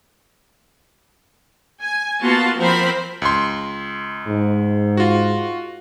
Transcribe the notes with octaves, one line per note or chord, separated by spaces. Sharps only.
G#5
A#3 B3 F4 F#4 A5 C6
F3 C4 A#4 C5 B5
C#2 C6
G#2
F4 F#4